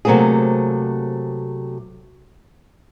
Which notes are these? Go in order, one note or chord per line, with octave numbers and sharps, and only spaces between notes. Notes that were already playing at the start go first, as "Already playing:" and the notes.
C3 F#3 A3 A#3 C4 G#4